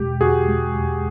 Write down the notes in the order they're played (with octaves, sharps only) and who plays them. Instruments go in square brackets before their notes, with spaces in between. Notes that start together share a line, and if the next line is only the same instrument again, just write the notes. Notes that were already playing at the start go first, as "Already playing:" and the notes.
Already playing: [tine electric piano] E2 B2 G#3 [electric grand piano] G4
[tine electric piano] E2 [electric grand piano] F#4 G#4
[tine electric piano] G#3
E2